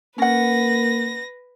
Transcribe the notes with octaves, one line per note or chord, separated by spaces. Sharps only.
A#3 C#4 B4 F#5 A#6